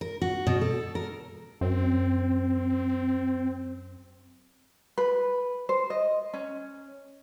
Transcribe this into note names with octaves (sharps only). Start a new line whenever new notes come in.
A#4
F#4
B2
A4
A#4
F#2 C4
B4
C5
D#5
C#4